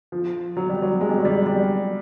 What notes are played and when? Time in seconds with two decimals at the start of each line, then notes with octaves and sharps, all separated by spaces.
0.12 F3
0.57 F#3
0.69 G3
0.82 F#3
1.01 G#3
1.09 G3
1.17 F#3
1.25 G3
1.46 G3